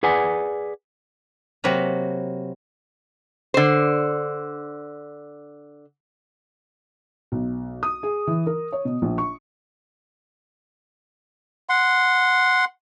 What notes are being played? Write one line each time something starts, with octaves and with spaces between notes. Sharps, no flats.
G#4 B4 D5 F#5 G#5
C3 F#3 A#3 B4 A#5
D3 C5
B1
D#6
G#4
E3
A#4
C#5
B2
A#1
C#6
F#5 C6